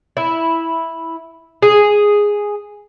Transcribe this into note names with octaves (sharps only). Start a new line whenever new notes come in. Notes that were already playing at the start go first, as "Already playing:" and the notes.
E4
G#4